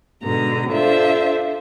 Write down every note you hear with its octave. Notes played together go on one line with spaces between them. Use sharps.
G#2 B2 D3 A#5
D4 F4 A4 C5 E5